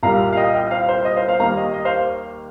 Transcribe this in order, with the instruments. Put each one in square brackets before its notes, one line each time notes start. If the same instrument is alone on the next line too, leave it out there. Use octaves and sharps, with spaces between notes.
[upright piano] C2 A#2 G3 A#3 F5 A#5
F5
D#5 G5
D#5 G5
C5 F5
C5
D#5
C5 F5
C5 F5
D#2 D#3 G3 A#3 F5 A#5
D#5
D#5
C5 F5